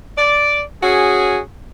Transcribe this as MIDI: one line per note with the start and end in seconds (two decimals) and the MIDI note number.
0.17 0.60 74
0.83 1.40 61
0.83 1.40 66
0.83 1.40 68